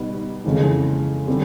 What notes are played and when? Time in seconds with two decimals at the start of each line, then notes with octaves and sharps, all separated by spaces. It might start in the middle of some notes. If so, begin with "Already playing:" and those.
Already playing: B2 G3 B3 D#4
0.44 F2 C#3 E3 G#3
1.27 D3 G3 C4